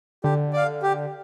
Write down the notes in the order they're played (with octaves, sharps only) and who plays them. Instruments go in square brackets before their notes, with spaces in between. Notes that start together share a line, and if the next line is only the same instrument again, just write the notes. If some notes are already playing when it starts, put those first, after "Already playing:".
[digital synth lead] D3 [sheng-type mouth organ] G4
[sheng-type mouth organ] D5 F5
G4